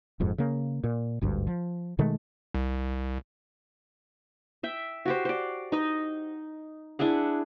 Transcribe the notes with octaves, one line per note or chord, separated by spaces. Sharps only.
D#1 F2 G#2
C#3 A#3
A#2
G#1 D2 G2
F3
B2 D#3 G#3 A3
C2
E5 G5
F#4 G4 C5
C5 D5
D#4 D#5
D4 E4 G#4 F#5